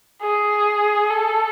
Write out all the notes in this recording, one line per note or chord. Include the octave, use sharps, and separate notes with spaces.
G#4
A4